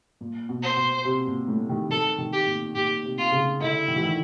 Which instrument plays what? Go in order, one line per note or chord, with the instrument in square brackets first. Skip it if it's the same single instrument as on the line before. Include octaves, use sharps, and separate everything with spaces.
[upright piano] A#2
B2
[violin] C5
[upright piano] B2
C3
A#2
A2
D#3
[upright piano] D#3 [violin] A4
[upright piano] D#3
[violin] G4
[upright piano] A#2
[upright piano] A#2 [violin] G4
[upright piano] C3
[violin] F4
[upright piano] C#3
[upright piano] D3 [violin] E4
[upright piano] D#3
E3
D#3